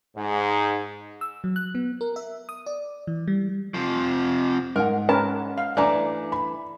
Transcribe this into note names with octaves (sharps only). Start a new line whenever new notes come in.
G#2
E6
F#3
F#6
B3
A#4
E5
D#6
D5
E3
G3
C3 F3
G#2 A#4 F#5
C#4 A#4 B4 A5
F5
E3 A3 D4 G#5 A#5 D6
B5